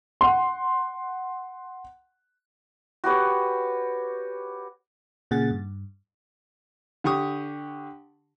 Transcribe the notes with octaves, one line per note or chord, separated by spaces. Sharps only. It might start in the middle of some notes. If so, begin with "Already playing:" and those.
F#5 C6
F#4 G4 B4 C#5
A#2 C#3 G#4 F#5 A6
G2
D3 G4 C#6 D#6